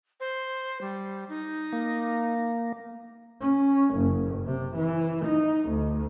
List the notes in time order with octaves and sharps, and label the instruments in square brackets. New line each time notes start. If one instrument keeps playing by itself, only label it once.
[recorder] C5
G3
D#4
[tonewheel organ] A#3
[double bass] C#4
F#1
C3
E3
D#4
D2